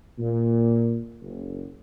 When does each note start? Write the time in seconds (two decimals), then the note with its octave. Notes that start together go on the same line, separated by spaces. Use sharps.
0.19 A#2
1.21 F#1